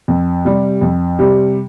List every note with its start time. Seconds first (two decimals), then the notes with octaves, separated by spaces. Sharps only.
0.08 F2
0.45 C3 G3
0.81 F2
1.19 C3 G3